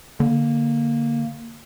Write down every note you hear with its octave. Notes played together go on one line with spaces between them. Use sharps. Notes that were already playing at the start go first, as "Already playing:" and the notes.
D3 A#3